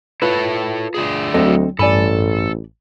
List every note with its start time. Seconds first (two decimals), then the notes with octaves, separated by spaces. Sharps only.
0.22 E4 F4 A4 B4 C#5
0.94 D3 A3 G#4
1.34 D2 F#3 C4 A4 D#5
1.79 A1 G2 A4 D5 G#5 B5